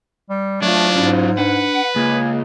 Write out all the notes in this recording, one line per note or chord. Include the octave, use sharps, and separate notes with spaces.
G3
F#3 A3 D4 F4
G#2 C#4 E4 F#4
D4 B4 F#5
C#2 A#3 G#4